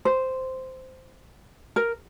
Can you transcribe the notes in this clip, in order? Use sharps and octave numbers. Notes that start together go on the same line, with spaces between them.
C5
A#4